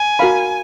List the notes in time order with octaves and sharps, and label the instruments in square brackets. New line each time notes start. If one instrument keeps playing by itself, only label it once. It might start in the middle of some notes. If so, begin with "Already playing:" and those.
Already playing: [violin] G#5
[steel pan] F#4 A#4 F5 B5